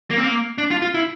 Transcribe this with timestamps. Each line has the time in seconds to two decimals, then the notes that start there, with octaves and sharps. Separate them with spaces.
0.10 A#3
0.17 C4
0.24 A#3
0.58 D4
0.71 F4
0.82 F4
0.95 E4